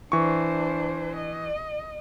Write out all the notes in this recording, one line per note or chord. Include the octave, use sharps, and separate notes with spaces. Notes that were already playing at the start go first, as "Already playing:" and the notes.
E3 D4 C5 C#6
D#5